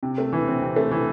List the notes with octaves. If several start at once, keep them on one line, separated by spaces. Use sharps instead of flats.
C3
A3
E3
C4
C3
A3
E3